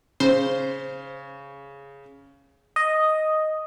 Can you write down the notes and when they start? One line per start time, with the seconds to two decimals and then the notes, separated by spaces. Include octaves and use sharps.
0.20 C#3 C5
2.76 D#5